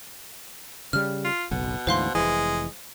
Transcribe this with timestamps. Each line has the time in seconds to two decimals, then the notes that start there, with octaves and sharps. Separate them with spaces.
0.93 C#3 G3 F6
1.25 F4
1.51 F#1 B1 B2
1.87 D2 G#2 E3 C5 F5 C6
2.15 F1 B1 E3 G#3